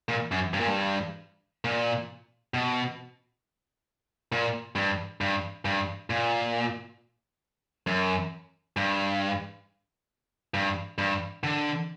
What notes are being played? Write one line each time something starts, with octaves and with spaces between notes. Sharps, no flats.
A#2
F#2
G2
A#2
G2
A#2
B2
A#2
G2
G2
G2
A#2
F#2
G2
G2
G2
D3